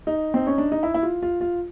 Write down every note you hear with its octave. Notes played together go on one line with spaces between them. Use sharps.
D#4
C4
C#4
D4
D#4
E4
E4
F4
F4
F4